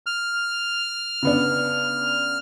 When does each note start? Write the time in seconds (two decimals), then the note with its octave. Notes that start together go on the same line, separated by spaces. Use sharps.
0.06 F6
1.23 C#3 B3 D4